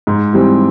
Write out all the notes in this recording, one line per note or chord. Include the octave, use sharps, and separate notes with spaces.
G#2
E3 G3 C4